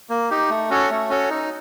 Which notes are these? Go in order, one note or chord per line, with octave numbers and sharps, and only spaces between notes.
A#3
D#4 G4
A3
C#4 F#4 A4 C#5
A3
C#4 F#4 A4 C#5
D#4